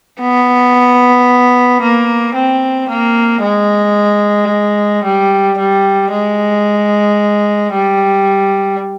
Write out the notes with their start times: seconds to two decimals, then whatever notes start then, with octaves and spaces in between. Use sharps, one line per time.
0.20 B3
1.82 A#3
2.34 C4
2.88 A#3
3.42 G#3
5.04 G3
5.58 G3
6.12 G#3
7.72 G3